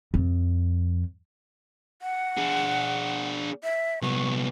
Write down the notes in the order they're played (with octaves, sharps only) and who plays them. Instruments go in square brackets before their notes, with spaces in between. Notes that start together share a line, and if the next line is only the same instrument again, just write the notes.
[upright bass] F2
[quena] F#5
[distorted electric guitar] D4 G#4
[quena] E5
[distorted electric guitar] C2 B3 [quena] C#6